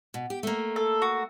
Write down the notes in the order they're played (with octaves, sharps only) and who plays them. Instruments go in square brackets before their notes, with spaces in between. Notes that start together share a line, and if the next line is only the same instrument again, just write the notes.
[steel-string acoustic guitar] B2
G4
A3 A#3
[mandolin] A4
F#4